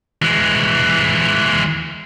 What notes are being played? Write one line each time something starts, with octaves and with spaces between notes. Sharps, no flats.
E3 G#3